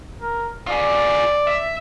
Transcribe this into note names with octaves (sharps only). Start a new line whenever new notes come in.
A#4
F4 G#4 D5
E5